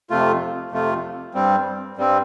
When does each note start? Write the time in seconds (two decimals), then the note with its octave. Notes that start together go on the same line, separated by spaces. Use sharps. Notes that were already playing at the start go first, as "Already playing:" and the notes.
0.10 F2 C3 A3 F4
0.71 F2 C3 A3 F4
1.34 G2 G3 C4
1.97 G2 G3 C4